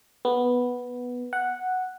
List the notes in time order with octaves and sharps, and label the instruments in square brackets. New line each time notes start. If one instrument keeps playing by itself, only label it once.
[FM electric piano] B3
F#5